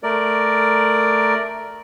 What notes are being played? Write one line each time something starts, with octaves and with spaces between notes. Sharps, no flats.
A3 A#4 D5